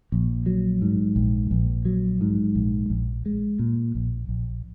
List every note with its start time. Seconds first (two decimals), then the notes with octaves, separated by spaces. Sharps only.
0.12 A#1
0.46 F#3
0.82 G#2
1.16 A#1
1.51 A#1
1.85 F#3
2.21 G#2
2.55 A#1
2.90 A#1
3.26 G#3
3.59 A#2
3.95 A#1
4.29 A#1